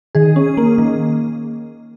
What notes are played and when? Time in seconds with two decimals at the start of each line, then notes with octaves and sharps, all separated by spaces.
0.15 D#3 G#4
0.36 C#4
0.57 A#3
0.78 D#3